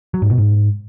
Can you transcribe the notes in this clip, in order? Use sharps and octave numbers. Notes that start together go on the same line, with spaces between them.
F#3
G#2
B2
G#2